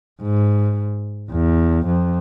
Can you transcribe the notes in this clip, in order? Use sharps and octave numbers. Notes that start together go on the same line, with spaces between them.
G#2
E2
F2